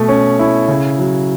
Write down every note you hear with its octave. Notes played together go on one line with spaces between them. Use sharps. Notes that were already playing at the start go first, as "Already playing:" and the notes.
Already playing: B2 A3
C#4
E4
C#3
F#3